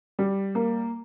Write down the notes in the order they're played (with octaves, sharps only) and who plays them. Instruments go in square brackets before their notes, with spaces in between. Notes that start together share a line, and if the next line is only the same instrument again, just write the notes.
[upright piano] G3
A#3